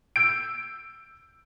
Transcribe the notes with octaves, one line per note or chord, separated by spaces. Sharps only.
E6 G6 D7